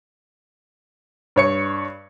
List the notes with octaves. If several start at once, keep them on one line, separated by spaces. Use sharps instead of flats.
G2 C#5 C#7